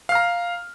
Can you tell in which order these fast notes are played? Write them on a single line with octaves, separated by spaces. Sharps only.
F5 F6 A#5